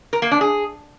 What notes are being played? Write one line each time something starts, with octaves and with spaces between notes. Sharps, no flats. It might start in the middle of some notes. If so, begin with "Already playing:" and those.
A#4
A#3
D4
G#4